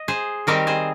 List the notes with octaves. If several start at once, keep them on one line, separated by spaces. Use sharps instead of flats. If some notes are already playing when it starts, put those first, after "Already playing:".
Already playing: D#5
G#4 C5
D#3 G3 C4 G4 A#4
G#4 C5